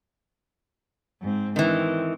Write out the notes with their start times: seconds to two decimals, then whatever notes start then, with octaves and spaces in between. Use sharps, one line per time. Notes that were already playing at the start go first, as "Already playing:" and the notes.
1.21 G#2 C4
1.56 D#3 E3 C4